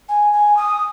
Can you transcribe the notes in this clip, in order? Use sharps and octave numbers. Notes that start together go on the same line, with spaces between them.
G#5
G#5
D#6